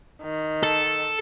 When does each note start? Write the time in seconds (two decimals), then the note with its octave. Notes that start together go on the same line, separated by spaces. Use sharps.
0.23 D#3
0.63 A4